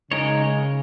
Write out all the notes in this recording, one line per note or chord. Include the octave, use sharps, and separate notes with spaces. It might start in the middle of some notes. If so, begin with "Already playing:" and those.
C#3 G#3 D#4 A#4 C#5